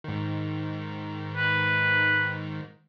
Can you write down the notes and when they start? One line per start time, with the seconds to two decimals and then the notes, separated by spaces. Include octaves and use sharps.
0.04 G#2 D#3
1.36 B4